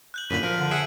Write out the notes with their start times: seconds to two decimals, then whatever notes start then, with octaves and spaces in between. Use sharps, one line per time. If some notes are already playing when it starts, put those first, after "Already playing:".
0.14 F#6 G6 F#7
0.30 F#2 A#2 D3 B5 D#7 F#7
0.43 F3 A#4
0.58 D3
0.71 G#4 E5 F#5 C7 D7